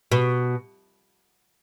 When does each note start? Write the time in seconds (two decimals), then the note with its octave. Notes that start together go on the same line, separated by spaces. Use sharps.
0.12 B2